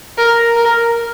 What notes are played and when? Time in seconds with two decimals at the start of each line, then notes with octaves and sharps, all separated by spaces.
0.18 A#4
0.56 A#4